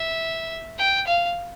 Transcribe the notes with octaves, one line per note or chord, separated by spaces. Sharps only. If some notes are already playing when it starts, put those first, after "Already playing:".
Already playing: E5
G5
F5